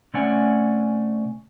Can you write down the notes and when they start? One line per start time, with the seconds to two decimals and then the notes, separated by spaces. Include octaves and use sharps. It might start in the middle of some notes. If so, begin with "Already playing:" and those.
0.14 C3 A3 C#4 D5 F#5 G#5